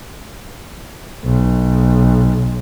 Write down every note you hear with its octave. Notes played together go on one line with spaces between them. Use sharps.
B1